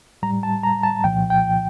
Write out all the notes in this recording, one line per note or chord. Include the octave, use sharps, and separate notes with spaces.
A2 G3 A#5
A5
A#5
A5
C2 A#2 F3 G5
G5